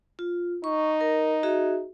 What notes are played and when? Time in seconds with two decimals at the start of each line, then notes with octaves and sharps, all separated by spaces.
0.19 F4
0.64 D#4 C#6
1.01 A#4
1.43 F#4 G#4 E5